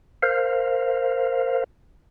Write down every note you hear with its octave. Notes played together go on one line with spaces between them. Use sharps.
A#4 C5 F5